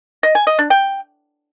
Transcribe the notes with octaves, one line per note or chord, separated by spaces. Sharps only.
D#5
G#5
D#5
D4
G5